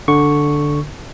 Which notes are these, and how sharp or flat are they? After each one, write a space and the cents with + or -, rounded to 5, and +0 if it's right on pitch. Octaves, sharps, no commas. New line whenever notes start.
D3 +0 C#6 +0